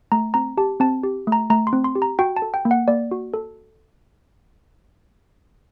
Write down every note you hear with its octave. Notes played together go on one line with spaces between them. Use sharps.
A3 A#5
C4 A#5
G4 A5
C4 A5
G4
A3
A#5
A3 A#5
C6
C4
C6
G4
A#5
F#4 G5
A5
A4
G5
A#3
F#5
A#3 D5
F#4
A4